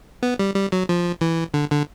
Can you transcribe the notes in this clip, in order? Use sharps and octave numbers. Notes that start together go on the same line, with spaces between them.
B3
G3
G3
F#3
F3
E3
D3
D3